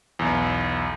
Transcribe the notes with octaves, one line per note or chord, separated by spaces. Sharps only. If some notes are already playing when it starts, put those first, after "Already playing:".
B1 E2